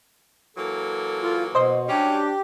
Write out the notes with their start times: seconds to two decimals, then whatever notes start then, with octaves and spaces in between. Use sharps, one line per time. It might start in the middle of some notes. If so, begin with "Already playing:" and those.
0.57 E3 F#3 A#3 A4
1.22 F4
1.55 B2 C5 D#5 C6
1.88 F#3 G3 C#4 D4 G4